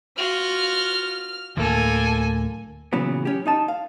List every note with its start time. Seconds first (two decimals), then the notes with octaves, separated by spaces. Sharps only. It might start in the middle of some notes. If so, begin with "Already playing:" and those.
0.18 F4 F#4 F6
1.57 D2 A2 D3 A#3 A4 G#5
2.93 A#2 C#3 E3 F#3 B3
3.25 C#4 G4
3.46 D#4 D#5 A5
3.68 F5